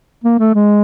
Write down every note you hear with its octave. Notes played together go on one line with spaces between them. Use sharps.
A#3
A3
G#3